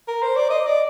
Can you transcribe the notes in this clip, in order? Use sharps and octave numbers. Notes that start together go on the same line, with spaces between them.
A#4
C5
D5
D#5
D5